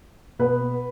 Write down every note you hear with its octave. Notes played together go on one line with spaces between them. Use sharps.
B2 B3 B4